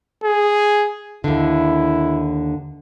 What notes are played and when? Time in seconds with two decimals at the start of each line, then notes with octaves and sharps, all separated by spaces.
0.24 G#4
1.24 D#2 D3 E4